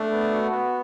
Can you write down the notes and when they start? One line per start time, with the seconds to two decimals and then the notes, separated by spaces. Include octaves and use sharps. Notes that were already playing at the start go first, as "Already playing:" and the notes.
Already playing: A3 D4
0.11 B3
0.32 F#4
0.51 B3